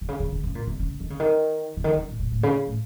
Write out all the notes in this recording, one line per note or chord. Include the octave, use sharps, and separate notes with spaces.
C3
C#3
C#3
C#3
C#3
A#2
C3
C#3
D#3
C#3
D#3
C#3
D#3
C#3
A#2
A#2
A2
C#3
A2